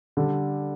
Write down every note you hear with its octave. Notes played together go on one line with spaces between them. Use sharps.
D3 G3 D4 A4